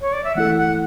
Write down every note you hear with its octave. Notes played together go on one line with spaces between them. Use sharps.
C#5
D5
E5
E3 A3 E4 A4 F#5
F#5